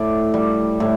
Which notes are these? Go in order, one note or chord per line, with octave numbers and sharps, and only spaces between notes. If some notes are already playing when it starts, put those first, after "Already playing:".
Already playing: A2 D5
G3
A2